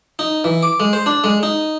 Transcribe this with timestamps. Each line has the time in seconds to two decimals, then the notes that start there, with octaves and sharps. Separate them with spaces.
0.19 D#4
0.44 E3
0.63 D6
0.80 G#3
0.93 C5
1.06 D4
1.24 G#3
1.43 D#4